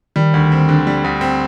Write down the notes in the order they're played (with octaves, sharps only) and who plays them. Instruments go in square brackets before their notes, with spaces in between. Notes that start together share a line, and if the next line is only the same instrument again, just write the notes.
[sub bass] D#3 [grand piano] G3
[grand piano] D2
C4
D3
G3
D2
C4